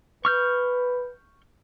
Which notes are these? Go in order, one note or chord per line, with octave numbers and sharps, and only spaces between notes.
B4 C#6 F6 G6